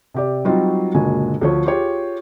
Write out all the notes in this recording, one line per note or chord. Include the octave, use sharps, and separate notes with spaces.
C3 G4 D5
F#3 G3 C4 D#4 F4 F#4
F#1 A#2 D3 G#3 F#4 G#5
D2 F3 C#5
F4 G4 G#4 C#5